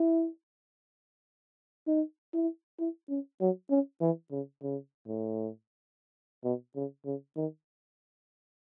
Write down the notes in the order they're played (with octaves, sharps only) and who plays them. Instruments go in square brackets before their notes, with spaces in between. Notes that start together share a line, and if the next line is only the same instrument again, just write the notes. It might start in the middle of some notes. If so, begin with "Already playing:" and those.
Already playing: [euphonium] E4
D#4
E4
E4
C#4
F#3
C#4
E3
C#3
C#3
A2
B2
C#3
C#3
D#3